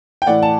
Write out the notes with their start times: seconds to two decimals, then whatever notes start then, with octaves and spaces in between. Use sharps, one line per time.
0.22 G5
0.27 A2 E3 D5 F#5
0.43 A5